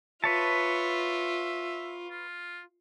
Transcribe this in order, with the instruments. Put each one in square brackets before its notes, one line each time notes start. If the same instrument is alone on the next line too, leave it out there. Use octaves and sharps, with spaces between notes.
[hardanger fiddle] F4 [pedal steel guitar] B4 C#5 A5 [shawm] E5
[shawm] F4